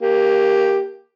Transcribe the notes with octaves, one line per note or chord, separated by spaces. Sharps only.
A#3 G4